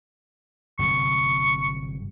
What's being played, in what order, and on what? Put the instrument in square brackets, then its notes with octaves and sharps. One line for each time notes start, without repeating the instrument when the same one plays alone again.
[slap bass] G1 C3 F#3 [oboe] C#6